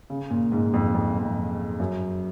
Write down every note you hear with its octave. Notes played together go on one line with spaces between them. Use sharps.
C#3
A#2
G#2
F2
F2
F2
F#2